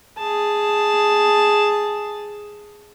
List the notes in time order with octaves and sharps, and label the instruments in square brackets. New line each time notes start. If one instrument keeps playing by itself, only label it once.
[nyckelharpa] G#4 A5